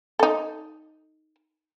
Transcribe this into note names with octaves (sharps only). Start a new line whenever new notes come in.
D#4 A4